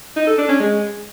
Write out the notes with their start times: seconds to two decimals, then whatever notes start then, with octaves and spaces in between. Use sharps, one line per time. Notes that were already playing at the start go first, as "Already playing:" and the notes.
0.16 D#4
0.27 A4
0.38 D4
0.49 C#4
0.60 G#3